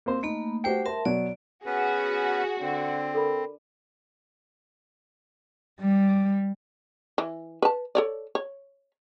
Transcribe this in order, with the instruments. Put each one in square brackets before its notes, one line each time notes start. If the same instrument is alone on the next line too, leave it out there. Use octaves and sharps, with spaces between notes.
[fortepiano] A#3 C4 C5
[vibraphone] A3 A#3 B5 [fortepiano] D#4
[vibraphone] A3 C5 [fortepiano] F#4 G4 G5
[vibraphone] A#4 E5 A5 [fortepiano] C5
[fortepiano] B2 F#3 [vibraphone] D5
[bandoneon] B3 C#4 B4 [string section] F#4 [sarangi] G#4
[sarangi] D3 [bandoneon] C4
[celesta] A4 A#4 B5
[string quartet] G3
[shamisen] E3
B4 A5
A4 C#5 D5
C#5